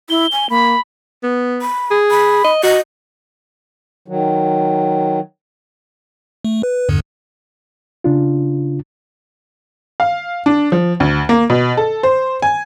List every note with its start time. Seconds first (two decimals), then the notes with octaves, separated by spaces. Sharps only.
0.10 E4 G7
0.32 G#5
0.50 A#3 B5
1.23 B3
1.61 B5
1.91 G#4
2.11 B5
2.44 D#5
2.63 F#4 D#5
4.08 D#3 F#3
6.45 A3
6.63 B4
6.89 E2 G2 D3
8.04 C#3 D4 F4
10.00 F5
10.46 D4
10.72 F3
11.00 D2
11.29 A#3
11.50 B2
11.77 A4
12.03 C5
12.42 G#5